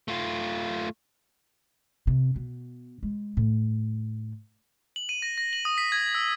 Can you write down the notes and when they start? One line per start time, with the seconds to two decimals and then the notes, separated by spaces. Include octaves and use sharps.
0.08 A3 F4
2.07 C3
2.36 B2
3.03 G#3
3.37 A2
4.96 F#7
5.09 D#7
5.22 A#6
5.38 A#6
5.53 F#7
5.65 D#6
5.78 B6
5.92 G#6
6.15 E6